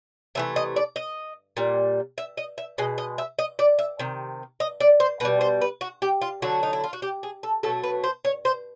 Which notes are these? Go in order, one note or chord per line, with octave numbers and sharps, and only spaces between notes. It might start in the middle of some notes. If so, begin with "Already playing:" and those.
C3 E3 A3 E5
D#5
D5
D#5
A#2 G3
E5
D#5
E5
B2 G#3 D#5
D#5
E5
D#5
D5
E5
C3 D#3
D#5
D5
C5
B2 G3 B4
C5
B4
F#4
G4
F4
D3 F#3 A3 F#4
D#4
E4
F4
F#4
G4
G#4
A4
B2 F#3 A3 A4
B4
C5
C#5
C5